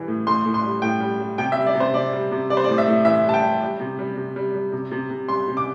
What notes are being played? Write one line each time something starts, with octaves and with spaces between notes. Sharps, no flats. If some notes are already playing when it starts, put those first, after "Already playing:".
Already playing: E3 G3
A2
A2 C6
A2
C6
G3
A2 G5
G3
G3
C3 G5
E5
G3
D5
C3
C5
C3 D5
G3
C3
G3 D5
C5
D5
A2
E5
A2
E3 E5
G3 A5
G5
G3
G3
C3
G3
C3
G3
G3
C3
C3
C3
G3 C6
C3
D6